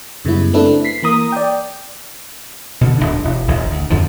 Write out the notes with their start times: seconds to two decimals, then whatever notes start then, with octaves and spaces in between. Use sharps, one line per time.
0.25 F#2 C#3 G3 G#3 B3 E4
0.53 A3 C4 D4 E4 A4 B4
0.85 B6 C7
1.03 E3 A#3 A#5 D#6
1.32 D5 G5
2.81 B2 D3 E3
2.98 D1 G#1 G#3 D4
3.25 E1
3.48 E1 A1 E2 G#2
3.71 D2
3.90 F2 G#2 D3 F3